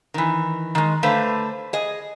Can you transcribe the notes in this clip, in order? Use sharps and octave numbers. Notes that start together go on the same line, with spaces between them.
D#3 E3
D#3 G#3
D3 A3 B4 C5 F5
G#4 D#5